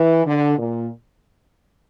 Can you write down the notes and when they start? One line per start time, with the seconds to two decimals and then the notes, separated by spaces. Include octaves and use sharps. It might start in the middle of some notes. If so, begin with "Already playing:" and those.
Already playing: E3
0.26 D3
0.58 A#2